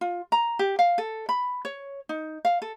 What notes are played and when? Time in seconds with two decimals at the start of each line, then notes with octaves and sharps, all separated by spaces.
0.01 F4
0.32 A#5
0.59 G4
0.79 F5
0.98 A4
1.29 B5
1.65 C#5
2.09 D#4
2.45 F5
2.62 A4